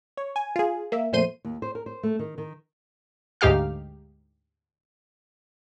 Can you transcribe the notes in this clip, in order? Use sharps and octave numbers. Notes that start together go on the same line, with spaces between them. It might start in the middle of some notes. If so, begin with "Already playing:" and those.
C#5
G#5
F4 G#4
A#3 E5
F2 A#2 A3 C5 C6 D#7
D#2
C5
A#4
C5
A3
D#3
D#3
D2 G#2 D#4 G4 F5 F6